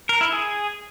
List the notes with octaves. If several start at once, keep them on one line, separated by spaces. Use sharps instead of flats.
A#4
E4
G#4